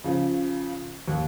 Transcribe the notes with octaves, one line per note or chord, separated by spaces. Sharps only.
C#3 F3
D#2